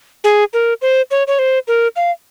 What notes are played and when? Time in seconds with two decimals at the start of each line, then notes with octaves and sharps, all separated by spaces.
0.24 G#4
0.53 A#4
0.82 C5
1.11 C#5
1.27 C#5
1.39 C5
1.68 A#4
1.96 F5